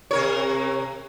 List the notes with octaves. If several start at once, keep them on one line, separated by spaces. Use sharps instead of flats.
C3 A#4 C#5